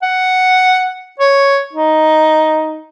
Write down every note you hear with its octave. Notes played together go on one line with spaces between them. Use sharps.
F#5
C#5
D#4